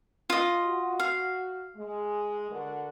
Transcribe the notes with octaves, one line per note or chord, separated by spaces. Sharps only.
F4 D#5
F#4
F5
G#3
D3 F#4 A#4